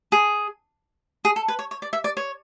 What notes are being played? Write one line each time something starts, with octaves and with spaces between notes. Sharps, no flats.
G#4
G#4
A4
B4
C#5
C#5
D5
E5
D5
C#5